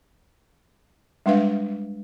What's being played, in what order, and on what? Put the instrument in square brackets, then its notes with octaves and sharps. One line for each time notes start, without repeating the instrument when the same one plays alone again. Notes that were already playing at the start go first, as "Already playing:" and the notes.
[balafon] G3 G#3 D4 B4 E5 F5